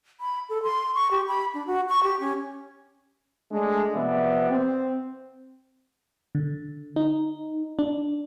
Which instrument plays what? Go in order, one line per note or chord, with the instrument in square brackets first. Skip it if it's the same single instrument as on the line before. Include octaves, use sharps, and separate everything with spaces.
[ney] B5
A4
C6
C#6
G4
B5
D4
F#4
C#6
G4
C#4
[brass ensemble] G#3 A3 D4
C3 F3 B3 B4 D5 E5
C4
[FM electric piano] D3
D#4
D4